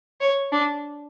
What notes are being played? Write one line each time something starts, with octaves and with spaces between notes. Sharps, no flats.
C#5
D4